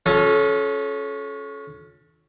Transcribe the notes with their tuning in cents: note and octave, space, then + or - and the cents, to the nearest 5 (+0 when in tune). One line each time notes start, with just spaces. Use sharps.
C#4 +0 F4 +40 A4 -30